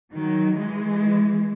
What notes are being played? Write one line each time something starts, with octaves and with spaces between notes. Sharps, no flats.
D#3 F#3
E3 G#3